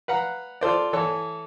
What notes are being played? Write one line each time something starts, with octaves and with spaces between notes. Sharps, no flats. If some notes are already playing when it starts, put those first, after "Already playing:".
B4 F5 F#5 A#5
F4 A4 C5 D5
E3 A4 C#5